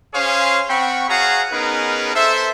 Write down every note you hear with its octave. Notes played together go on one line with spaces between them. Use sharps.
C#4 G#4 C5 C#5 F5 C6
C4 F#5 G5 B5 C#6
F#4 G#4 C#5 F5 F#5 A#5
B3 C#4 D#4 G#4 A#4 B4
A4 C5 E5